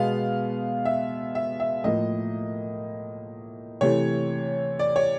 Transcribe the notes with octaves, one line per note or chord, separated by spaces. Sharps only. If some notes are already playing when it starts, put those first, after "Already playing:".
Already playing: B2 G#3 B3 F5
E5
E5
E5
A2 F3 A#3 D#5
C3 E3 A3 C#5
D5
C#5